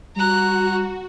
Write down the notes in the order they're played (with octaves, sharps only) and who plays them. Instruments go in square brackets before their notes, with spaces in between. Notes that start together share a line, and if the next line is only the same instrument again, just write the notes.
[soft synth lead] G3 [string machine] F#4 [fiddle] A#5 F#6